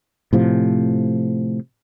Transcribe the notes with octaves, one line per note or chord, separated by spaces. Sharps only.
A2 C3 F3